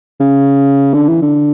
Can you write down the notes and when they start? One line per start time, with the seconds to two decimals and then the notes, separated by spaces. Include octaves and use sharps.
0.20 C#3
0.94 D3
1.08 E3
1.22 D3